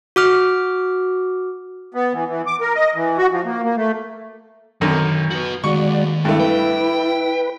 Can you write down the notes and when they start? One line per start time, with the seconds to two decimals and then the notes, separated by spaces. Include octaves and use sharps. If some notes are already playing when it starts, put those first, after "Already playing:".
0.16 F#4 D6 F6
1.94 B3
2.13 E3
2.28 E3
2.47 D6
2.61 A#4
2.75 D#5
2.95 E3
3.18 F#4
3.32 F3
3.45 A#3
3.63 A#3
3.76 A3
4.81 B1 F#2 D3 D#3
5.30 F#4 B4
5.64 D#3 G#3 F#4 G4 D5 C#6
6.25 G2 G#3 A3 E4
6.40 B4 G5